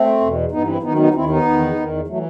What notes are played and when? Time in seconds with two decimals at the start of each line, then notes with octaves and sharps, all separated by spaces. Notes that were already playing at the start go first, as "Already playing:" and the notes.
Already playing: A3 C4
0.21 E2 B2
0.52 G2 E3 B3 D#4
0.67 C4 E4
0.82 F#2 D#3 B3 D#4
0.94 C4
0.98 B3 D#4
1.14 D#2 D#3 C4 E4
1.29 B3 D#4
1.46 E2 D#3
1.76 E2 D#3
2.08 E3 F#3 A3